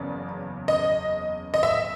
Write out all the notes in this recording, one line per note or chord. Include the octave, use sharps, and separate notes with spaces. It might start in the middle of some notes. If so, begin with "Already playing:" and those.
Already playing: F#1 E2 C#3 D5
D#5
D#5
E5